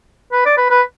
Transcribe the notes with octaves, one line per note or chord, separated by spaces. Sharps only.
B4
D5
B4
B4